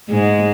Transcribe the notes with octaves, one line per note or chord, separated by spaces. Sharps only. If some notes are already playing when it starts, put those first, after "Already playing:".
G#2 G#3